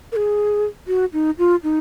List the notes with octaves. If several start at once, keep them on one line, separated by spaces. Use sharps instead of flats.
A#4
G#4
F#4
D#4
F4
D#4